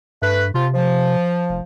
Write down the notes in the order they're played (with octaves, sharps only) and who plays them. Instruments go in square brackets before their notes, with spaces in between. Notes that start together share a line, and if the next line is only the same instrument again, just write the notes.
[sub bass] G2 [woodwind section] A3 B4
[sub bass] C3 [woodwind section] F3 F4
[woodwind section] F3
[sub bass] F1